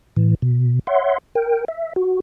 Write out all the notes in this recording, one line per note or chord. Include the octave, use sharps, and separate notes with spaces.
A2 E3
B2
C#5 E5 F#5 C6
A#4 G5
E5
F#4